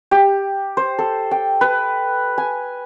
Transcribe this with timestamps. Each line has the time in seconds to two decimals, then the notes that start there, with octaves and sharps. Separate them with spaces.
0.11 G4
0.77 C5
0.99 A4
1.31 G5
1.61 B4
2.38 G#5